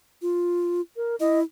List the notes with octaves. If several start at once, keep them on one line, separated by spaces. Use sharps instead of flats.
F4
A#4
E4 D#5